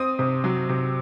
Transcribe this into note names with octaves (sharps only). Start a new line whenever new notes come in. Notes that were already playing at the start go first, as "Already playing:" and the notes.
Already playing: C4 D#6
C3
F#3
C3